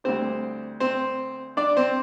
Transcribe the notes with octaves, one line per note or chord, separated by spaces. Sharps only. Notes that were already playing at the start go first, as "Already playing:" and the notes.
D2 D3 G3 C4 D4 C5
C4 C5
D4 D5
C4 C5